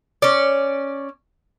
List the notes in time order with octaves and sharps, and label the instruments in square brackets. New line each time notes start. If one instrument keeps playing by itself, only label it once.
[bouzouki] C#4 D5